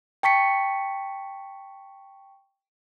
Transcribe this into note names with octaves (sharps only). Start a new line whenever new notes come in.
G5 A5 C#6 B6 C#7